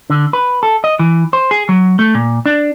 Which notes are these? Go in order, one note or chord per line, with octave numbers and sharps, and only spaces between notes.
D3
B4
A4
D#5
E3
C5
G#4
F#3
A3
A#2
D4